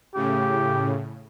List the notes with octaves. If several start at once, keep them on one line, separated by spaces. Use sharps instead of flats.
A2 C#3 G4